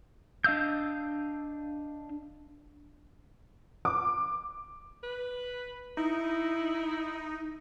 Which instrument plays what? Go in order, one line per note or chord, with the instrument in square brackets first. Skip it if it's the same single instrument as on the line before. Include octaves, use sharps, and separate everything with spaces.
[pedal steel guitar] D4 D#5 F5 E6 G6
[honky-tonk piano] D6
[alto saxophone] B4
[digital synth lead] D#4 [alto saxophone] E4